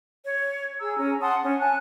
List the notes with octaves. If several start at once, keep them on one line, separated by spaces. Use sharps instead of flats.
C#5
G#4 A#5 E6
C#4 A#5
F#5 A5 C6 D#6
C#4
G#5 A5 F#6